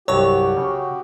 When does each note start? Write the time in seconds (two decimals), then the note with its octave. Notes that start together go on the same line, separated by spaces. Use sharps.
0.08 C2 G2 F#3 F#4 G4 C#5 C#6
0.57 C#3